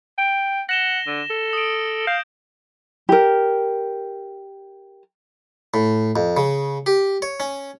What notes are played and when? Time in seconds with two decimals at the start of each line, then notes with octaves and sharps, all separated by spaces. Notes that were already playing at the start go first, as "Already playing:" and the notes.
0.18 G5
0.69 F#5 A#6 E7 G7
1.07 D3
1.30 A4
1.53 D#6 D7
2.07 F5 G6
3.09 G4 A#4
5.74 A2
6.16 F2
6.37 C#3
6.86 G4
7.22 C#5
7.40 C#4